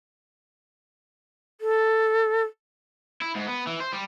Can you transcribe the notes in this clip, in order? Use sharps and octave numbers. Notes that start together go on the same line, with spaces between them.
A4
E4
G#2
B3
E3
C5
G3